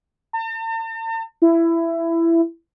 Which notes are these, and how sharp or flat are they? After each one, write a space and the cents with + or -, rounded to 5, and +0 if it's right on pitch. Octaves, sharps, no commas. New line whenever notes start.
A5 +45
E4 +15